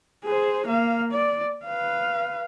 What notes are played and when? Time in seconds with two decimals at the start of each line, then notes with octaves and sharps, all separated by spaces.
0.25 G#4 C5
0.67 A#3 F5
1.12 D5
1.65 B4 F5